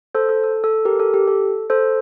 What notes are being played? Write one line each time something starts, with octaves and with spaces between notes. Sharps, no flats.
A4 C5
A4
A4
A4
G4 A#4
A4
G4
A4
A4 C5